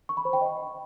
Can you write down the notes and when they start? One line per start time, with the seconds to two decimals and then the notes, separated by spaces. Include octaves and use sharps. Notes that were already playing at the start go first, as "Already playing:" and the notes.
0.09 C#6
0.17 B5
0.25 C5
0.33 G5
0.41 D#5